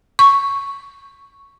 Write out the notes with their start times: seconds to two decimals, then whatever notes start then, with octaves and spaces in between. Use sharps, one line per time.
0.19 C#6